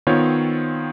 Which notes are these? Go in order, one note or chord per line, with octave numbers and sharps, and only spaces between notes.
D#3 B3 C4 F4 C5 C#5